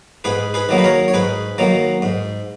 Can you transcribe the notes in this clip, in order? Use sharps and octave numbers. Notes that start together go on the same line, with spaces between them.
G#2 G#4 B4
G#4 B4
D#3 F#3 A#3
B4
A#4 C#5
C#5
G#2 G#4 B4
D#3 F#3 A#3
G#2